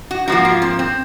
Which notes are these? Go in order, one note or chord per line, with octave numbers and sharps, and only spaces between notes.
F#4
G#2 F3 A#3 F#4
F4
C4
C4